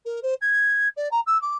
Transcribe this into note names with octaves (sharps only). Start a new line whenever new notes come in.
A#4
C5
G#6
D5
A#5
E6
D6